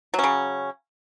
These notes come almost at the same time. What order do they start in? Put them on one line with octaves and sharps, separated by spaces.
F#3 C#4 C#3